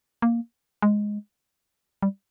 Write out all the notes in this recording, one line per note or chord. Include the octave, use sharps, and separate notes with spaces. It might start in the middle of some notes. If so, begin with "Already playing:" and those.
A#3
G#3
G3